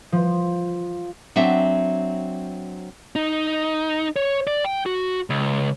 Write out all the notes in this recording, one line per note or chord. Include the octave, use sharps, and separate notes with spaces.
F3
F#3 C4 D4 E5
D#4
C#5
D5
G5
F#4
C#2